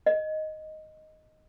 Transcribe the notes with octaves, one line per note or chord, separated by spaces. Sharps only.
D#5